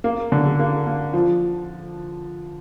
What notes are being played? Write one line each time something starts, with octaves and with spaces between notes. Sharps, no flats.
A#3
D3
A#3
A#3
F3